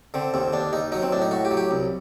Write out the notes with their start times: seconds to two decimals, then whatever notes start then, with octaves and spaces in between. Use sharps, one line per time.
0.14 D3 C4
0.34 D#2 C4
0.53 D#2 D4
0.73 D#2 D#4
0.92 F#3 D#4
1.02 C4
1.12 A2 D4
1.22 D#4
1.31 A2 F#4
1.45 G4
1.51 F#3
1.57 G4
1.71 C2